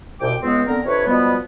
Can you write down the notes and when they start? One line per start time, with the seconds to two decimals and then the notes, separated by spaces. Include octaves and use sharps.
0.20 C2 B2 G5 D6
0.41 C#2 G#3 B3 C4
0.67 D3 B3 C4 A#4
0.85 F2 C3 D4 B4 C#5
1.05 B2 F3 G3 G#3 B3